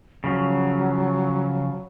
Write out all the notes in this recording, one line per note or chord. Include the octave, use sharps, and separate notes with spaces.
C#3 F3 F#3